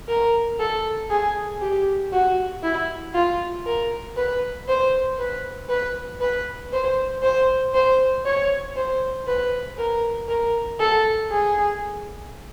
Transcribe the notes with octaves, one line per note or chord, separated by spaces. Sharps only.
A#4
A4
G#4
G4
F#4
E4
F4
A#4
B4
C5
B4
B4
B4
C5
C5
C5
C#5
C5
B4
A#4
A#4
A4
G#4